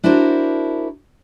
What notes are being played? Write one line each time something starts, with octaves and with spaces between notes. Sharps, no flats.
D4 E4 F#4 A#4 C5 D5